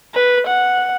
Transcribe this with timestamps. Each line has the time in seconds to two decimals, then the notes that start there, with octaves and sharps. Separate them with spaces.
0.14 B4
0.47 F#5